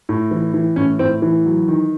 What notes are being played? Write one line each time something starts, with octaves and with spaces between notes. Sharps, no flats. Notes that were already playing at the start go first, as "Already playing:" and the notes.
A2
E3
E3
A2 C#4
A2 C4
E3
F#3
D#3